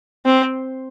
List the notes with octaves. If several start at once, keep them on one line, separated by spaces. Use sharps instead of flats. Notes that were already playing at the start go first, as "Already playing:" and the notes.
C4